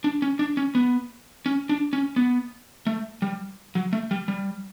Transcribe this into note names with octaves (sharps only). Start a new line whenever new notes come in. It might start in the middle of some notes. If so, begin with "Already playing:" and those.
D4
C#4
D4
C#4
B3
C#4
D4
C#4
B3
A3
G3
F#3
A3
G3
G3